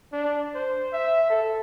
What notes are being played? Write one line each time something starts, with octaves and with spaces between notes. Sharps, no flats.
D4
C5
E5
A4